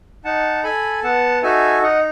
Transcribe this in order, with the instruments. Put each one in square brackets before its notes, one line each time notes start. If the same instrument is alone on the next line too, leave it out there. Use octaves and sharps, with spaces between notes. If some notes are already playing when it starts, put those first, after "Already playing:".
[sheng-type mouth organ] D#4 F#5 A5
A4 G#5 B5
B3 F#5 A5
D#4 F#4 A4 E5 G#5
D#4 D#5 F#5